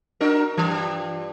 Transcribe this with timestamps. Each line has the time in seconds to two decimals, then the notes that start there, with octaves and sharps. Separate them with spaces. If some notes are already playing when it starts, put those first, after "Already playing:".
0.20 D4 F#4 A#4
0.57 G2 E3